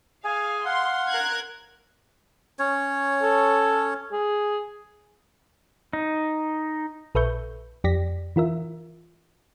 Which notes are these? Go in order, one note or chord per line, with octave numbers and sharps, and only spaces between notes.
G#4 F5 G#5
F5 F#5 C6
A#4 F#6 G#6
C#4 C#5
A4
G#4
D#4
A#1 A4 B4 E5 C#6 G6
F2 G4 D5 A#6 B6
E3 F4 A#4 E5